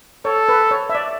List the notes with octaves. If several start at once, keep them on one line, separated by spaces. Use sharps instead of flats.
A4 C#5
B4
C#5
E5
D5